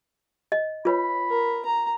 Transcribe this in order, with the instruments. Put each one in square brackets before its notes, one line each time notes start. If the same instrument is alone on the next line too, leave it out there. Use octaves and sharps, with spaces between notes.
[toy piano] D#5
[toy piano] F4 B4 C#5 [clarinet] B5
[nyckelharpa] A#4
A#5